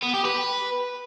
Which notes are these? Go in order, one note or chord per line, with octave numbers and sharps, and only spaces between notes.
B3
G4
B4